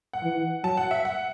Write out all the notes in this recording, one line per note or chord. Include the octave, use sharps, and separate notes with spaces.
F#5
E3
F#3 A5
F#5
E5
F#5